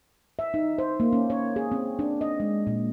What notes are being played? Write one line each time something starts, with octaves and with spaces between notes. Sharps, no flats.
E5
D#4
C5
A#3
C#4
C#5
G#4
C4
D4
D#5
G#3
A#2